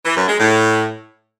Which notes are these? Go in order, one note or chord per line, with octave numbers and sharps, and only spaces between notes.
E3
F#2
G#3
A2